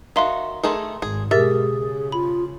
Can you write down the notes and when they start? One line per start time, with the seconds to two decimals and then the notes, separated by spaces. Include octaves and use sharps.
0.16 D#3 F#4 E5 F5 C6
0.63 D#3 A3 G#4 A#4 C6
1.02 G#1 G#4
1.31 B2 G#3 G4 G#4 A#4 E5 A6
1.70 C#3
2.12 F4 B5